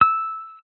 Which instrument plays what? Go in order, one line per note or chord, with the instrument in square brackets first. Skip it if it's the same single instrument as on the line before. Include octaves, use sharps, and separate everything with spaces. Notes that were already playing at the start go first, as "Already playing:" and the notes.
[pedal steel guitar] E6